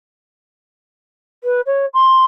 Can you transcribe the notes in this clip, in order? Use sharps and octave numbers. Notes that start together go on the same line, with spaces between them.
B4
C#5
C6